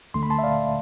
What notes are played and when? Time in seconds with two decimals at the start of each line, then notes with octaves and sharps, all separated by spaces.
0.14 D2 D3 A3 C6
0.23 B5
0.30 A5 C6
0.39 E5
0.43 D5 F5